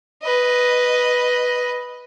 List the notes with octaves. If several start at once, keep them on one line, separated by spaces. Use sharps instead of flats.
B4 D#5